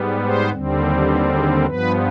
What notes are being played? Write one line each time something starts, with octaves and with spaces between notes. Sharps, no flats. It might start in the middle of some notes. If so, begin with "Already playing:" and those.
Already playing: G#2 G3 B3
C5
D#2 D3 G3 C4
B4
G#4
G2 F3 B3 B4